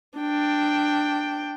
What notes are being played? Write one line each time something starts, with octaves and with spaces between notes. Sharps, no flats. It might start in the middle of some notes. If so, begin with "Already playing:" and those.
D4 G5